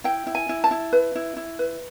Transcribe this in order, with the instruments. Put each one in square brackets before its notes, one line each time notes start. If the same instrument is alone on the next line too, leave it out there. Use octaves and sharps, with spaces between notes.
[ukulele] E4 G5
E4
G#5
E4
A5
E4
B4
E4
E4
B4